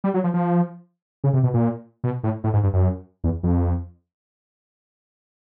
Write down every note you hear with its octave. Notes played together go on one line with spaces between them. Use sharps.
G3
F#3
F3
F3
C#3
C3
B2
A#2
B2
A2
A2
G#2
G2
F#2
E2
F2